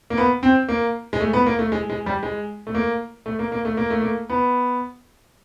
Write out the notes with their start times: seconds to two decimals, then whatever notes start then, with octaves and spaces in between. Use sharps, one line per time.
0.10 A#3
0.17 B3
0.43 C4
0.69 A#3
1.13 G#3
1.20 A3
1.33 B3
1.46 A#3
1.59 A3
1.72 G#3
1.90 G#3
2.06 G3
2.23 G#3
2.67 A3
2.75 A#3
3.26 A3
3.39 A#3
3.52 A#3
3.65 A3
3.77 A#3
3.90 A3
4.02 A#3
4.29 B3